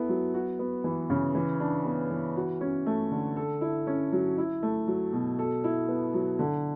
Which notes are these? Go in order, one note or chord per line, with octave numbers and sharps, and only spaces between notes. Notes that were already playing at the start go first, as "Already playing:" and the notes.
Already playing: B3 E4 A4
F#3
F#4
B3
E3
C#3
E3
D4
B3
E3
F#4
C#4
A3
D3
A4
E4
C#4
F#3
E4
A3
F#3
B2
A4
E4
B3
F#3
D3